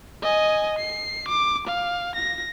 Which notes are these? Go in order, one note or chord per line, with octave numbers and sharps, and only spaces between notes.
D#5 G#5
C7
D6
F5
A#6